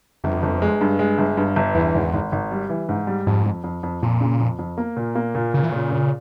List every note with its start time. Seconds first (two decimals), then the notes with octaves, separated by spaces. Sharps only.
0.24 G1 F2
0.43 G1
0.62 G#3
0.81 G2
0.99 G#3
1.18 G1
1.37 G2
1.56 G1
1.75 E2 E3
1.95 G#1
2.13 G#1
2.32 G#1
2.51 G3
2.70 E3
2.89 G#2
3.07 G3
3.27 F2 G#2
3.45 F2
3.64 F2
3.83 F2
4.03 F2 A#2
4.21 C#3
4.41 F2
4.59 F2
4.78 A#3
4.97 A#2
5.16 A#3
5.35 A#2
5.54 A#2 C#3
5.63 E3
5.71 A#2 C#3
5.91 A#2